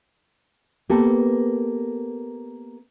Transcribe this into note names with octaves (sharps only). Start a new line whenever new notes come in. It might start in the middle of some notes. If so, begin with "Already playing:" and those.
A#3 B3 G4 A4